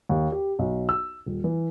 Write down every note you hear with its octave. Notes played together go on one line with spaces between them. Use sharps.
D#2
G4
B1
E6
D#1
E3